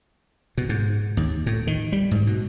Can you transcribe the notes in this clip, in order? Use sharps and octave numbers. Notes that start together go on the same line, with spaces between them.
B2
G#2
D#2
A2
D#3
G3
G#2
B2